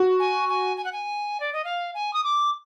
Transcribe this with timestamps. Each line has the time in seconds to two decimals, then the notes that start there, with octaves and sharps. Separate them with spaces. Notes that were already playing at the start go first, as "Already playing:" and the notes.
Already playing: F#4
0.20 G#5
0.49 G#5
0.77 G#5
0.85 F#5
0.93 G#5
1.40 D5
1.53 D#5
1.65 F5
1.95 G#5
2.13 D#6
2.24 D6